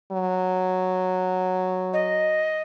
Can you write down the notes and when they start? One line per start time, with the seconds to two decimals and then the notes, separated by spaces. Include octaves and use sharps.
0.12 F#3
1.93 D#5